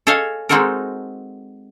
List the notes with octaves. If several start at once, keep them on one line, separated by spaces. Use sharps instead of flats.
A4 C#5 D#5 F5 G#5
G#3 C4 D#4 F#4 A4 A#4